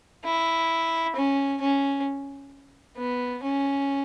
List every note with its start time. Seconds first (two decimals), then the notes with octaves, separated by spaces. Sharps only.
0.25 E4
1.16 C#4
1.61 C#4
2.97 B3
3.43 C#4